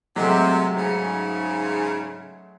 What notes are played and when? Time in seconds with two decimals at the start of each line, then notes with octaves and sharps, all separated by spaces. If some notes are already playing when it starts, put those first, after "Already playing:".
0.16 C3 F#3 G#3 A3
0.75 G#2 C#3